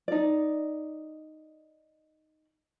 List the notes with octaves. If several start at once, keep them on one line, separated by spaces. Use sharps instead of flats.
D#4 D5